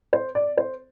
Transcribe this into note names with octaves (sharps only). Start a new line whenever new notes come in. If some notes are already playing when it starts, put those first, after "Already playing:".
C5
D5
C5